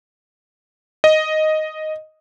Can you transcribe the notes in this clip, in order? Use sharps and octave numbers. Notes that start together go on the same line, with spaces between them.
D#5